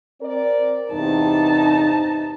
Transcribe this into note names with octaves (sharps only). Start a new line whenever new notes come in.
C4 A#4 D5
E2 G2 C3 D#4 A5